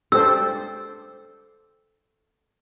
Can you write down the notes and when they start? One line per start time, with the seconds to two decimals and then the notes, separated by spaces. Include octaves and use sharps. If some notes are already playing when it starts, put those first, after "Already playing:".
0.12 D4 G4 A4 C5 E6